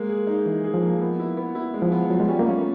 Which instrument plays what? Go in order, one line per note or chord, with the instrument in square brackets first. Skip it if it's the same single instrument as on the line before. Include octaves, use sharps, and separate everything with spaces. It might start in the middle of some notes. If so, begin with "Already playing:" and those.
Already playing: [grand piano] G#3 A#3
G#4
D#4
[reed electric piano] E3 [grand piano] G#4
[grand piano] G#4
[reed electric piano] F3
[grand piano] A#3
B3
E4
B3
E4
G#3
[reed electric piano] F3
[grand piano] B3
[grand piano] F3 [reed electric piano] F#3
[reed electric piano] G#3
[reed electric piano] G3 [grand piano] C#4
[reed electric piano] A#3
[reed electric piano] A3 [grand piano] C#4